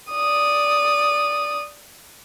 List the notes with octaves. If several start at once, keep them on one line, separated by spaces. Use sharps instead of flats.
D5 D#6